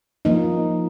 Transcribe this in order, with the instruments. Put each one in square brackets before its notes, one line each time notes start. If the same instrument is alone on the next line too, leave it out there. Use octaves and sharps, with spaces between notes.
[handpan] F3 A#3 D#4